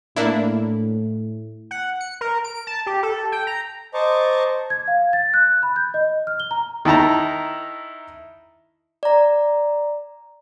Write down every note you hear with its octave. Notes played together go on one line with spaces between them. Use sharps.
A2 A#3 D4 E4
F#5
C#7
A#4
D7
A5
G4
A4
G5
A#5
C5 D#5 A5 A#5 C#6 D6
G#6
F5
A6
F#6
B5
G6
D#5
F6
G7
A#5
D#3 E4 A5 A#5
D5 A#5